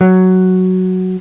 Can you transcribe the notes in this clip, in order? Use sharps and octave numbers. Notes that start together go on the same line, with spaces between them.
F#3